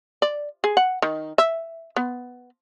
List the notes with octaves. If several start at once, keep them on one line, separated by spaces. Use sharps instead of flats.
D5
G#4
F#5
D#3
E5
B3